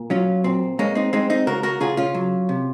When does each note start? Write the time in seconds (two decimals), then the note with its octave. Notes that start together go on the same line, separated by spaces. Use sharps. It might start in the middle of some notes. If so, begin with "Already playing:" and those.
Already playing: A#2
0.10 F#3 C#4 F4
0.44 A#2 C4
0.79 G#3 A#3 C#4
0.95 C4 D#4
1.13 G#3 C4 D#4
1.30 C4 D#4
1.47 C#3 F#4 A#4
1.63 F#4 A#4
1.80 C#3 F4 G#4
1.97 C#4 F4
2.14 F#3
2.49 C3